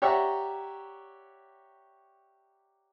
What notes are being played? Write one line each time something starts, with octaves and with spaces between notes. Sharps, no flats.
G4 C#5 D5 E5 F#5 A#5